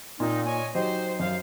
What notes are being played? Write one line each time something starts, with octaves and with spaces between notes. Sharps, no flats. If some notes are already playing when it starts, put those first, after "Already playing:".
A#2 A#3 C4 D#4
C#5 D#5 G#5
F#3 D#4 G4 C5
F#2 C5 F5